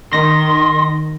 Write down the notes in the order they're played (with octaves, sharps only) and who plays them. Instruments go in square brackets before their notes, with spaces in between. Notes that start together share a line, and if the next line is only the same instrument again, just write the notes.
[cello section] D#3 [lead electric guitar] C6 [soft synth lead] A#6